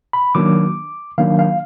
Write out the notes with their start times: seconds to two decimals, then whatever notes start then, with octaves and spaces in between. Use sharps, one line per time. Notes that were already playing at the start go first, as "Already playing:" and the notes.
0.13 B5
0.35 D#3 F#3 A#3 D4 D6
1.18 D#3 F#3 A#3 D4 F5
1.39 F5